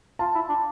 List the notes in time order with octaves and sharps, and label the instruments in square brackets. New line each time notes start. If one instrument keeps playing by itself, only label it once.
[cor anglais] F4 [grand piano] A5
[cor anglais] E4
D4